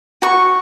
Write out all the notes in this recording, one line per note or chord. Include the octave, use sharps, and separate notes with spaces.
F#4 C#6